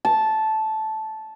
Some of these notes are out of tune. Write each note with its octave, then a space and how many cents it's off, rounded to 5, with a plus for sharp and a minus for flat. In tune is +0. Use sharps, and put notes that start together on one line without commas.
A5 -10